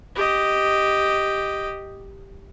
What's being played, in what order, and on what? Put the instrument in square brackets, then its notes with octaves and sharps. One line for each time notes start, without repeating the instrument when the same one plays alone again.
[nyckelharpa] G4 D#5